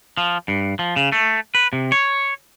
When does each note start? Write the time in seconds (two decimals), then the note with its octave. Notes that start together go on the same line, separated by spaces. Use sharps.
0.17 F3
0.48 G2
0.79 F3
0.96 C#3
1.12 A3
1.55 B4
1.73 C3
1.92 C#5